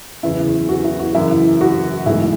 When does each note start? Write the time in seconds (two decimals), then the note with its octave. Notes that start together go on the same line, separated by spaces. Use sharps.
0.23 F#1 E2 C#3 E4
0.69 F#4
0.84 E4
0.99 F#4
1.15 F#1 F#2 E3 E4
1.61 F#4
2.06 B1 A2 E3 G#3 E4